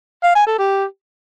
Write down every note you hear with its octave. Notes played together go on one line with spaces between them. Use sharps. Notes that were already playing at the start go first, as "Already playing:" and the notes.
F5
G#5
A4
G4